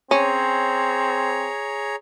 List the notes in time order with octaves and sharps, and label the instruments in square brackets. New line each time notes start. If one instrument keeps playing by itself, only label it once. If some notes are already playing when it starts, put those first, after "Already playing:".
[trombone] C4 [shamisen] C#4 [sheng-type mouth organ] G#4 C#5 A#5